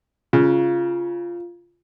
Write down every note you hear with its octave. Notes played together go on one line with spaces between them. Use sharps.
C#3 F4